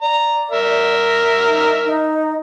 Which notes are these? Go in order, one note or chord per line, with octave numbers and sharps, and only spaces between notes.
D5 A#5
A#4 E5
D#4
D#4